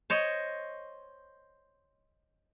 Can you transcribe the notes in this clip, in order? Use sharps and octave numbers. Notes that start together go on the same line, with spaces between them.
C5 C#5 D#5